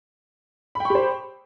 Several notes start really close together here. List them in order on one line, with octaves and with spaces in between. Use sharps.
B5 G5 C#6 G4 C5